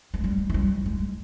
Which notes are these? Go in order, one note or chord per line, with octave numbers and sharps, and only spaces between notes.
G#3
G3
G#3
G3
G#3